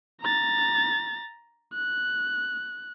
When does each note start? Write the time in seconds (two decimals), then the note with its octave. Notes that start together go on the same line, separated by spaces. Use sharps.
0.21 A#5 A6
1.73 F#6